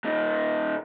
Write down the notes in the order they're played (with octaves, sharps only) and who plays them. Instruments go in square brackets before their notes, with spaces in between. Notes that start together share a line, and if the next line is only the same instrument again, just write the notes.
[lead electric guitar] A#2 D#4